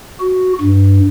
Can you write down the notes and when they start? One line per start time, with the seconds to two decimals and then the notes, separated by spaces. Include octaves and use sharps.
0.20 F#4
0.61 G2